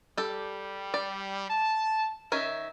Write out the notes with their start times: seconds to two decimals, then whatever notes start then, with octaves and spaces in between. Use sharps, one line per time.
0.17 G3 G4 A4
0.94 D5
1.49 A5
2.32 D#3 C#4 D#4 E5